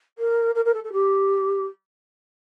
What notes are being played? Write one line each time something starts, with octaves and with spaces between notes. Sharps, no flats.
A#4
A#4
A#4
A4
A4
G4